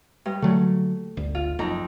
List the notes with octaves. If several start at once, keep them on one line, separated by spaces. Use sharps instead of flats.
G2
D3 F#3 A3
G1 D2
F4
F#1 F2 D#4 A#5